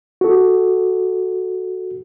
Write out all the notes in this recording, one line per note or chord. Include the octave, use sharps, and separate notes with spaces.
F#4 A4